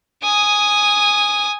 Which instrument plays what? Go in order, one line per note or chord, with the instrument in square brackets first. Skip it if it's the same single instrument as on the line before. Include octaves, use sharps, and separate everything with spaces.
[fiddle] G#5 D#6